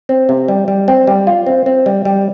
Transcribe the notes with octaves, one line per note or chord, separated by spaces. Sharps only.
C4
C3
G3
G3
C4
G3
F4
C4
C4
G3
G3